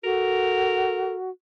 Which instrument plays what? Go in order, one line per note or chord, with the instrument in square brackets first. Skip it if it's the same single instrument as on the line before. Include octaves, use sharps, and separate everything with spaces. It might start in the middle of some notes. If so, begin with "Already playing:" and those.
[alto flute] F#4 [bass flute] A4 [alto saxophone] A#4